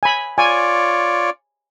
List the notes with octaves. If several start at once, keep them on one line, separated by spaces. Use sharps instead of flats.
G#5 B5
F4 C#5 D5 G#5